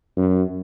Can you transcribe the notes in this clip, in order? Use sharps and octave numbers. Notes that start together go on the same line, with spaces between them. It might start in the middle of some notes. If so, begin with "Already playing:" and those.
F#2